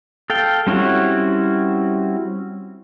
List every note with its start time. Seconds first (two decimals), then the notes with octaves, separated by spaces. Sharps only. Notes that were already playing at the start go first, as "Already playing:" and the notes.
0.30 A4 F5 G5
0.67 G3 C4 C#4 E4 F#4